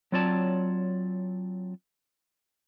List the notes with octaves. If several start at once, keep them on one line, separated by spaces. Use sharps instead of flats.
F#3 C4 F4 C#5 D5 A5